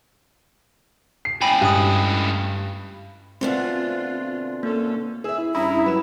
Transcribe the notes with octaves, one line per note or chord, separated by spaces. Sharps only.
C7
C#2 A2 G5 G#5 B5
G2 D#6 F#6
D2 B2 C4 D4 F4
A#3 C#4 F4 A4
G#4 E5 E6
E4
G2 C#4 E4 E5 A#5 D#6
F#3 B4 E7